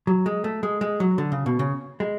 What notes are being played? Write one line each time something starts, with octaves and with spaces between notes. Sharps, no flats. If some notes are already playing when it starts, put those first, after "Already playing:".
F#3
G#3
A3
G#3
G#3
F#3
D3
C#3
B2
C#3
G#3